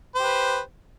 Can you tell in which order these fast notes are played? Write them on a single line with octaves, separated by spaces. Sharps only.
C5 G4 B4